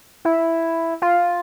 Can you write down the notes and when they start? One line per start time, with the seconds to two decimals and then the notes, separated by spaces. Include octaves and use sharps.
0.25 E4
1.02 F4